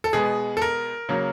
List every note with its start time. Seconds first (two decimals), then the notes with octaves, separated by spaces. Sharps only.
0.04 A4
0.13 B2 G#3 B3 G#4
0.57 A4
0.62 A#4
1.09 C#3 F#3 A#3